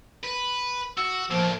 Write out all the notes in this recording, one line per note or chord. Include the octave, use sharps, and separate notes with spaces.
B4
F#4 E6
A2 F3 A#3